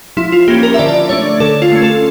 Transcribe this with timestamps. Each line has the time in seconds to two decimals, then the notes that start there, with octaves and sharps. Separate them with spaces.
0.17 F3 E4
0.32 F4
0.48 A#3 C#4 G4
0.63 A#4
0.74 E5
0.79 D3 D5
0.94 D5
1.09 A3 D4 C#5
1.40 D3 A4
1.62 F4
1.72 A3 C#4
1.82 A4